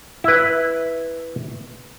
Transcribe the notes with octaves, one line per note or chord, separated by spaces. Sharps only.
E4 B4